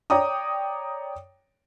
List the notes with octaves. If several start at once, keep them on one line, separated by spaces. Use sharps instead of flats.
C#5 D5 G5 A#5 D6 D#6